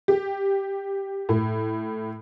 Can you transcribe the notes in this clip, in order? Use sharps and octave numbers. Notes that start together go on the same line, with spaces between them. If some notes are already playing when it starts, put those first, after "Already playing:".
G4
A2